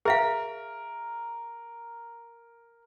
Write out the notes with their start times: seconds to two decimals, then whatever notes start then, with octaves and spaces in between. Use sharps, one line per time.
0.05 G#4 A#4 E5 F5